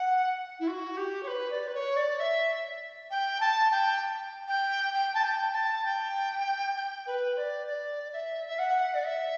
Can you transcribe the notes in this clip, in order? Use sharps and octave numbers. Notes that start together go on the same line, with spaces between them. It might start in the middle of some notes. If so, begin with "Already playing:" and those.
Already playing: F#5
E4
F#4
G4
C#5
B4
D5
B4
C#5
D5
E5
G5
A5
G5
G5
G5
A5
G5
A5
G5
G5
B4
D5
D5
E5
E5
F#5
D5
E5